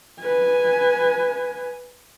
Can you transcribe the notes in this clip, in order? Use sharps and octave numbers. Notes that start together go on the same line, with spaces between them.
B4 G#5